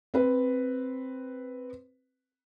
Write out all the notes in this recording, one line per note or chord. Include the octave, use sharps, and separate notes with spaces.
C4 B4